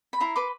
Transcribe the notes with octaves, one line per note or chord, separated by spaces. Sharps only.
B5
E4 A#5 C6
B4 C6 D6